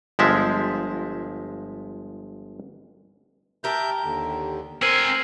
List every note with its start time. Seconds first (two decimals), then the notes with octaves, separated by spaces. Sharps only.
0.19 G1 F3 G#3 E5
3.64 G4 A#4 E5 A5 G6
4.04 D#2 D3
4.82 C4 A#4 C5 G#5 E6 C7 D#7